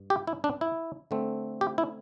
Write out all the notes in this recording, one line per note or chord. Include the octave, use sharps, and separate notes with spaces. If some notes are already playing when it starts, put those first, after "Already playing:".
Already playing: G2
G4
E4
D4
E4
D3 A3 C4
G4
E4